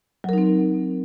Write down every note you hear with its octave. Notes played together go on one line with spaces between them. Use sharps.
F#3 C4 D#4 A#4